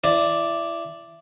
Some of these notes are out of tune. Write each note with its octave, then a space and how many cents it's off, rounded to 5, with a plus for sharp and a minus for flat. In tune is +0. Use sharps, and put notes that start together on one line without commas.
E4 +25 D5 +0